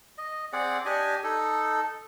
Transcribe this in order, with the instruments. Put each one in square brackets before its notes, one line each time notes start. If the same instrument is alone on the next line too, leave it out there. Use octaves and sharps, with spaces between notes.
[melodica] D#5
C4 G#4 D5 F#5
D4 G4 D#5 G#5
D#4 A4